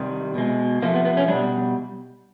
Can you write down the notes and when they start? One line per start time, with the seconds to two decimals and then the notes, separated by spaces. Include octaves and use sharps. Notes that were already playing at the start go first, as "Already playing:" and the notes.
Already playing: C3 D#3 G3
0.35 B2 G#3
0.82 C3 F3 A3 A#3
0.94 B3
1.05 B3
1.17 C#4
1.28 B2 G3 D4